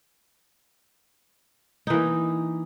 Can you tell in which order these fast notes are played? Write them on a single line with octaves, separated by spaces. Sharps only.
D#4 E3 A#3